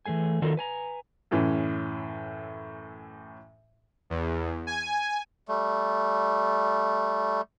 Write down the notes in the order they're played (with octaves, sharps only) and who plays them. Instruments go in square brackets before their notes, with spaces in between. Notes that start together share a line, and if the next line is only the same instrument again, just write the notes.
[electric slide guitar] E3 F3 A3 G#4 G#5
D#3 F4 F#4 A4 A#4
B4 G#5 A#5
[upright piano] F#2 A2 E3 C#4
[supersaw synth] E2
G#5
[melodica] G3 A3